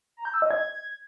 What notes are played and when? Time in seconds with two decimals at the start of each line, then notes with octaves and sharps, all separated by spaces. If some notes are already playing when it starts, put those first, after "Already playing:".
0.17 A#5
0.25 G6
0.34 E6
0.42 D#5
0.51 G#6